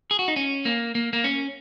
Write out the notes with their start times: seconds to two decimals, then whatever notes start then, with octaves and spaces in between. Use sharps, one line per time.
0.11 G#4
0.19 F#4
0.28 D#4
0.36 C#4
0.65 A#3
0.95 A#3
1.13 A#3
1.24 C#4